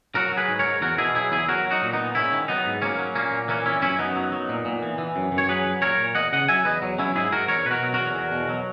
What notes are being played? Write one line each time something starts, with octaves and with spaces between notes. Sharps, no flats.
F#3 F#4 A#4
F#3
G#4 B4
G#2
A#4 C#5
G#2
E2 F#4 A#4
B2 E4 G#4
F#3 E4 G#4
E2 E4 G#4
F#3 F#4 A#4
F#3
D#4 F#4
A#2
B3 D#4
A#2
G#2 C#4 E4
D#3
F#3 B3 D#4
G#2
F#3 A#3 C#4
F#3
A#2 A#3 C#4
A#2
E3 A#3 C#4
E3 C#4 E4
F#2 C#4 E4
F#2 B3 D#4
F#3
F#3
A#2
A#2
E3
E3
F#2
F#2
C#5
F#3 G#4 B4
F#3
A#2 A#4 C#5
A#2
E2 D#5 F#5
C#3 D#5 F#5
F#3 E5 G#5
E2 B4 D#5
F#3
F#3 C#4 E4
G#2 E4 G#4
G#2 F#4 A#4
E2 A#4 C#5
B2 F#4 A#4 B4
F#3
F#4 A#4
E2
E2
B2
F#3